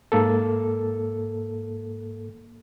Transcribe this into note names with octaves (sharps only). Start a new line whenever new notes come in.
G#2 A#3 A4